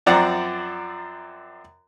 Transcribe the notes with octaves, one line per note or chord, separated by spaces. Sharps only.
F#2 F3 C4 D5 F#5 A#5